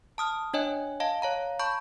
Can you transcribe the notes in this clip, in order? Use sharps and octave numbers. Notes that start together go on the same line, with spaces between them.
A5 D#6 F6
D4 C#5 D#5 G#5
D#5 F5 A5
C#5 F5 A#5
A5 B5 C#6 G6